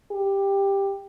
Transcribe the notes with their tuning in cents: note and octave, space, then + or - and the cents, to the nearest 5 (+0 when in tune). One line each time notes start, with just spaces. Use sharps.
G4 +10